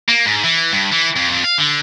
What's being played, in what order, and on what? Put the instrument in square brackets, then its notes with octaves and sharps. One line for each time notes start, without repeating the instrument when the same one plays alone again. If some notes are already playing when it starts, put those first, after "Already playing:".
[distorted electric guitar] A#3
G#2
E3
G2
E3
F2
F2
F5
D3